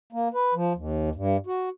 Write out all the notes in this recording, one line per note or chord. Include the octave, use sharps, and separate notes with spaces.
A#3
B4
F3
D#2
G2
F#4